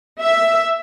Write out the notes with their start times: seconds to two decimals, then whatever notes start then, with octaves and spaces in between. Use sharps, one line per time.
0.22 E5